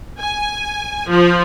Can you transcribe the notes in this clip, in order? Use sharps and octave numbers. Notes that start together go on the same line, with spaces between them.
G#5
F3